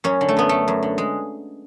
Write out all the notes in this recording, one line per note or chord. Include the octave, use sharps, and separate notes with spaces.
F#2 C#4
D3
A3
F#2 B3
D3 A3
F#2
D3
G#3